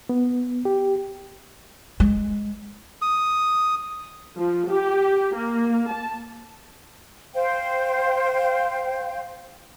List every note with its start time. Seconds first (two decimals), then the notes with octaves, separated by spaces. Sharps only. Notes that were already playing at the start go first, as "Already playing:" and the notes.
0.09 B3
0.65 G4
2.00 G#3
3.02 D#6
4.37 F3
4.70 G4
5.35 A#3
5.90 A5
7.34 C5 F5 G5